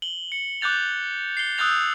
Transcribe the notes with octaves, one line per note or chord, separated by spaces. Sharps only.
F#7 G7
C#7
D6 F#6 G6 A6 F7
C7 G7
D#6 E6 F#6 G6 A6 F7